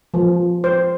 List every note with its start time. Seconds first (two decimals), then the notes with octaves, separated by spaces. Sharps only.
0.14 F3
0.64 C5